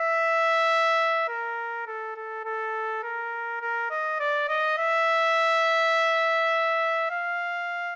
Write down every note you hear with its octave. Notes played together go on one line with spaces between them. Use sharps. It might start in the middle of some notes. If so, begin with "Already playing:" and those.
Already playing: E5
A#4
A4
A4
A4
A#4
A#4
D#5
D5
D#5
E5
F5